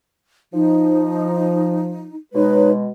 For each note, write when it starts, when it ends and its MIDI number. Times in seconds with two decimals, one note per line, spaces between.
0.53 2.08 53
0.53 2.16 63
2.34 2.90 47
2.34 2.90 56
2.34 2.69 63
2.34 2.69 71
2.34 2.69 73